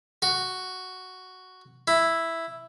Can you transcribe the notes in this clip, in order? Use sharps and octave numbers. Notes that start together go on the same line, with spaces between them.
F#4
E4